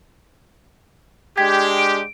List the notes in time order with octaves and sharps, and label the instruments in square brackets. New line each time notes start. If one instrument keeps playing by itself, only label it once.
[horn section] G#3 D4 G4 [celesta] G5 G#6 B6
[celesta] D7